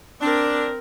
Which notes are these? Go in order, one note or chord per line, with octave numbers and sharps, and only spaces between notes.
C4 D4 A#4